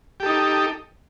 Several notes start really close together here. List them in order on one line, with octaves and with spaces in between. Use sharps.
G4 A4 D#4